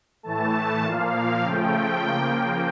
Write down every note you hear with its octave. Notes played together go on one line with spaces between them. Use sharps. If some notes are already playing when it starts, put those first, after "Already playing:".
A2 E3 A3 A5
A#2 F3 A#3 F5
C#3 F3 A3 G5
C#3 F3 A#3